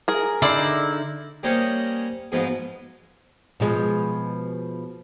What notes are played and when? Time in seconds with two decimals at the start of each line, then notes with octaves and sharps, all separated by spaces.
0.08 G#4 A#4
0.42 D3 D#4 E4 D5 F5 C6
1.43 G3 A#3 C#4 C5 C#5 D#5
2.32 G#2 B2 F3 G#3 B3
3.60 B2 F3 G#3